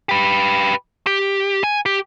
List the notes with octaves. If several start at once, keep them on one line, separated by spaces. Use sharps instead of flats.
G4 B4
G4
G#5
G4